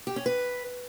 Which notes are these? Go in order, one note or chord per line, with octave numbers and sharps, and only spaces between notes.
G4
C#4
B4